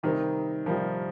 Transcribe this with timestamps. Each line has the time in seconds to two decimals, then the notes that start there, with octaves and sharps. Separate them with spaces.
0.03 C3 D#3 G3 C4 D#4 A#4
0.66 C3 F3 G3 C4 D#4 A#4